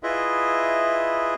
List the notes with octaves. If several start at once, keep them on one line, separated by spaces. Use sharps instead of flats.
E4 F4 G#4 B4 D#5 E5